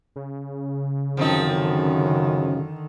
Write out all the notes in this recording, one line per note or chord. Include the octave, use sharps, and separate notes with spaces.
C#3
F#2 D3 D#3 F3 C4 D#4